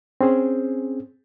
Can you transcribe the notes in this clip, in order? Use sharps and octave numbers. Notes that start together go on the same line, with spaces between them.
C4 C#4 G#4 C5